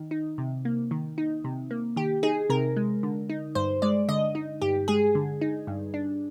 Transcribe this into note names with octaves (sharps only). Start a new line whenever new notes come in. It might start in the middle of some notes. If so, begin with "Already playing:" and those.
Already playing: D#3
D#4
C3
A#3
D#3
D#4
C3
A#3
D#3 G4
D#4 G#4
C3 A#4
G#3
D3
D#4
G2 C5
G#3 D5
D3 D#5
D#4
G2 G4
G#3 G#4
D3
D#4
G2
D4